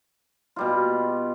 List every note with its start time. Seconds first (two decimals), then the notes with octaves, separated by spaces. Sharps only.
0.56 B2 G3 F4